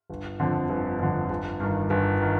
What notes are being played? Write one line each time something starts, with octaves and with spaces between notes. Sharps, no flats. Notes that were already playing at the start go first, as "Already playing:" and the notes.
G1
F2 D3
G1
F2 D3
G1
G2 D#3
G1
D#3